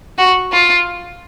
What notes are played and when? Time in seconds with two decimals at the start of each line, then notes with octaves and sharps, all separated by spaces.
0.18 F#4
0.52 F4